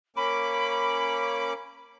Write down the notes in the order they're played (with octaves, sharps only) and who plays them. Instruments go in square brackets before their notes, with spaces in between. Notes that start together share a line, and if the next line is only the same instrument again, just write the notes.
[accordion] A#3 C#4 D6 [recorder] B5